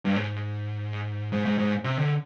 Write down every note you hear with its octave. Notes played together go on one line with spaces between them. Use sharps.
G2
G#2
G#2
G#2
G#2
C3
D3